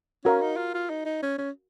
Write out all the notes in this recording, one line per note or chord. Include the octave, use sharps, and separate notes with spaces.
C#4 F#4 A#4 F5
D#4
F4
F4
D#4
D#4
C#4
C#4